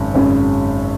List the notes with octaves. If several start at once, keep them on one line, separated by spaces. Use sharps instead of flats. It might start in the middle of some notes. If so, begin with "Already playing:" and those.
Already playing: G#1 F#2 C#3
G#1 F#2 C#3